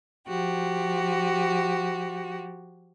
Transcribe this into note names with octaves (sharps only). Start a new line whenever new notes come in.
F3 F#4 G4